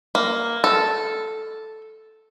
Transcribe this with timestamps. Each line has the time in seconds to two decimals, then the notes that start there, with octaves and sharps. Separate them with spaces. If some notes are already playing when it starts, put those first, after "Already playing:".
0.15 A#3
0.64 A4